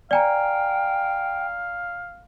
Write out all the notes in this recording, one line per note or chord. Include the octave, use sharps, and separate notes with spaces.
D5 F5 G5 G#5 A#5